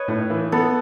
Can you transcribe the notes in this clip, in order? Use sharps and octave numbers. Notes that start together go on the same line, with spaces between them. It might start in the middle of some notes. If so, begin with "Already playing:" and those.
Already playing: B4 C#5 D#5
A2
E3
B3 A4